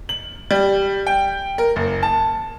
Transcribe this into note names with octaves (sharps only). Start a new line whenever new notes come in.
F#7
G3
G5
A#4
F#1
A5